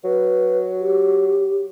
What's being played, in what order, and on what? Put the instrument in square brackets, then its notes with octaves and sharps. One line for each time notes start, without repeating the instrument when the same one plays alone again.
[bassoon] F#3 [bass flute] B4
[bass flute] G4